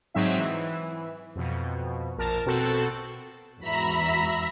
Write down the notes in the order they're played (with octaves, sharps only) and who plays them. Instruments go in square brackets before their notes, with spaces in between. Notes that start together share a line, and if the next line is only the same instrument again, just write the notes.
[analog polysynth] G#2 F#3 C4 D#4 E5
E3
F2 B2
A#1 A#4 A5
B2 C4 F#4 A4
[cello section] E2 G#2 F#4 [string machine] E5 A#5 B5